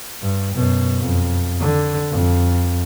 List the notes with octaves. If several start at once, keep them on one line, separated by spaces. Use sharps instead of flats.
G2
F#2 B2
F2
D3
F2